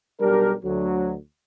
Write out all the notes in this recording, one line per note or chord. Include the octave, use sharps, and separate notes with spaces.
B1 G3 D4 G4 A#4
D2 F#3